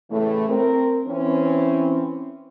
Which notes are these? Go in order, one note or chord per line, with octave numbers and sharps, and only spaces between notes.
A2 C#3 E3 A3
C4 A#4
E3 C4 C#4